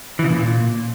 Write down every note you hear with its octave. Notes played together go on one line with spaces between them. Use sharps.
E3
C#3
A#2